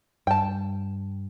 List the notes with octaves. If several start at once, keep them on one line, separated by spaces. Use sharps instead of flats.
G2 G5 A5